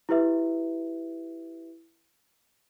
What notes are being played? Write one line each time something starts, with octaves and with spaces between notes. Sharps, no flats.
E4 G4 B4 E5